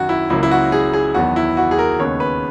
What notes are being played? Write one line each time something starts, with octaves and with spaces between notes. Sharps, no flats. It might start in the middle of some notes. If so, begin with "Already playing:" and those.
Already playing: F#2 D#3 F#3 F#4
E4
C#2 C#3 F#3 A#3 E4
E4
F#4
G#4
G#4
E2 D#3 F#3 B3 F#4
E4
F#4
G#4
A#4
D#2 C#3 G#3 B3 C#5
B4